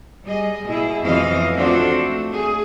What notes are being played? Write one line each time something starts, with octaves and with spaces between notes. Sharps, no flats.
G3 G#4 D#5
B2 E4 G#4
F2 B2 E3 F#3 D#5 F5
C4 D4 F4 F#4 A4 C5
A3
G#4